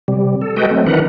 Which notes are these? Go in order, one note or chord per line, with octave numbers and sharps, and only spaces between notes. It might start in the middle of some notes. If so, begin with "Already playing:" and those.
C3 G3
A4
G#3 F#4 A4 B4 D#5 G5
F#3 A3 C4
D#3 E3 D4 A#4 B4 F#5